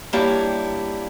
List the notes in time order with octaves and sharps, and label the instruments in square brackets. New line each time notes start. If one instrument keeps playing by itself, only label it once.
[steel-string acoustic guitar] G3 A#3 D4 E4 G4 C#5